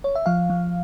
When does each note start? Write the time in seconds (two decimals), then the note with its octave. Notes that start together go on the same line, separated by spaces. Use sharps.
0.04 C#5
0.15 E5
0.26 F3 F5
0.50 F3